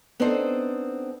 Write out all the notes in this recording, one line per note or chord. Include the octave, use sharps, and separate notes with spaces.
B3 C4 D4 D#4 A4 C5